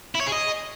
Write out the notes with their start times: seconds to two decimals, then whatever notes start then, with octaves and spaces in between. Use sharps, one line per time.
0.15 E4
0.21 C#5
0.26 G#4
0.32 D#5